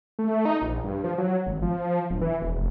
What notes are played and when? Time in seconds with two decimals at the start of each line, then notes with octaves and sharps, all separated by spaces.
0.19 A3
0.45 D#4
0.62 A#1
0.84 G2
1.04 F3
1.18 F#3
1.46 G#1
1.62 F3
2.10 D1
2.21 E3
2.42 E1
2.55 F1